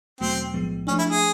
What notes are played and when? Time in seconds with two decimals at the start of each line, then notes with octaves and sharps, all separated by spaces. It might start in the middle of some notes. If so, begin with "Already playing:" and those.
0.20 E2 B2 F#3 A3 C4
0.54 B1 A2 F3 G#3 B3
0.87 F3 A3 C#4 D4
0.98 E4
1.10 G#4